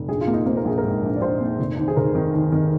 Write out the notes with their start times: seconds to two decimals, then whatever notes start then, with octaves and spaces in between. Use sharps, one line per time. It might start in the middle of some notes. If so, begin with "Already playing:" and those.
Already playing: F1
0.08 A#1 G#4
0.21 F4
0.28 A#3
0.33 D#4
0.46 A#3 C5
0.57 A#4
0.65 A#1 G#4
0.78 A#4
0.84 G#2
1.02 A#1
1.16 D5
1.21 A#1 C5
1.41 A#3
1.59 F1
1.77 D#2
1.88 G#4
1.97 F1 A#4
2.15 D#3
2.34 D#2
2.52 D#3